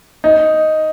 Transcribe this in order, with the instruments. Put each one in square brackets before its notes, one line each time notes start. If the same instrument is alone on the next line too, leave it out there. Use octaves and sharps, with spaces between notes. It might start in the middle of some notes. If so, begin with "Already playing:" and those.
[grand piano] D#4